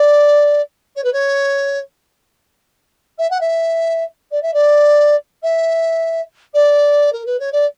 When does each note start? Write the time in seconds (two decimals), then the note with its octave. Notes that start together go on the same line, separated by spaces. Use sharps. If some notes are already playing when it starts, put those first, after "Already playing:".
Already playing: D5
0.96 C#5
1.03 B4
1.12 C#5
3.18 E5
3.30 F#5
3.40 E5
4.31 D5
4.42 E5
4.53 D5
5.43 E5
6.54 D5
7.12 A#4
7.25 B4
7.39 C#5
7.52 D5